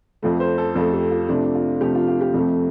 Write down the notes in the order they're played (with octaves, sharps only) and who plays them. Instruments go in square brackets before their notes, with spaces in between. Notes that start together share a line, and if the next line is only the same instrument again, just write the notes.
[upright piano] F2 F3 A3
C5
A4
F2 F3 A3 A4
G4
F4
C3 F3 A3 D4
F4
C3 F3 A3 G4
F4
F4
G4
F2 C3 F3 A3